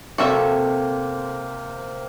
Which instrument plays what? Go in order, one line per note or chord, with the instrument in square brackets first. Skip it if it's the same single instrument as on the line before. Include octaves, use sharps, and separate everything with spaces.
[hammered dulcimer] C3 A#3 [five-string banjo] F#4 A4 E5